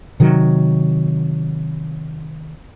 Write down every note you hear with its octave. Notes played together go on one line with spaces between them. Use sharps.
C3 D#3 F#3